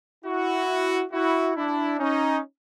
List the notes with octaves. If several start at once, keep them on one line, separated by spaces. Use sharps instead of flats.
E4 F#4
E4 F#4
D4 E4
C#4 D#4